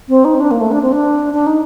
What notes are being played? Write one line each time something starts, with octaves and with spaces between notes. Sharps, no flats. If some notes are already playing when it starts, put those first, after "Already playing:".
C4
D#4
C4
D4
A#3
A3
D4
C4
D4
D4
D#4